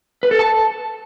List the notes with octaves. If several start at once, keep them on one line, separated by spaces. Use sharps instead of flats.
B4
A4
A5